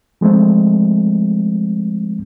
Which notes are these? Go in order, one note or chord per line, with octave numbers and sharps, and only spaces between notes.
F3 G#3 A3 C4